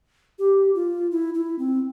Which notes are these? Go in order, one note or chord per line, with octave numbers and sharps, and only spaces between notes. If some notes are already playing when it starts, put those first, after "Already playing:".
G4
F4
E4
E4
C4